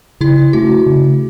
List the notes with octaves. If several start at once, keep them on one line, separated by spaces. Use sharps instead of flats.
C#3 E4
A3 C#4 F#4
C#3